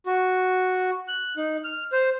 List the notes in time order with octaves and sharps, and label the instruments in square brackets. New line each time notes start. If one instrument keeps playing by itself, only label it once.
[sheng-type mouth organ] F#4
F#6
D#4
F6
C5